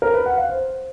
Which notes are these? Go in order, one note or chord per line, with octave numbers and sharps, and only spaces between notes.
A#4
B4
F#5
F5
C5